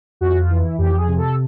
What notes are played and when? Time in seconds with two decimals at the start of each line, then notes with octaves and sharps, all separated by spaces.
0.21 F2 F#4
0.40 F4
0.50 E3
0.59 E4
0.78 F2 G4
0.97 G#4
1.07 C3
1.18 A4